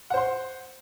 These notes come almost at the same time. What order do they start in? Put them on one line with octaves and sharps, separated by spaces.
F#5 C5 C6